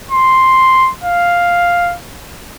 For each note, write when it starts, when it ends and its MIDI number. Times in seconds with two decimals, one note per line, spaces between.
0.11 0.91 84
1.04 1.95 77